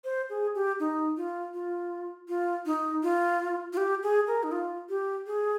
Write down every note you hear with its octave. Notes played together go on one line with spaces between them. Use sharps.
C5
G#4
G4
D#4
F4
F4
F4
D#4
F4
F4
G4
G#4
A#4
D#4
F4
G4
G#4